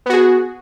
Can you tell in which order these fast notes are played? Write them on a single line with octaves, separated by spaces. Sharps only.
B3 F#4 G#4